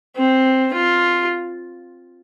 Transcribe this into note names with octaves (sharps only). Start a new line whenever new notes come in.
C4
F4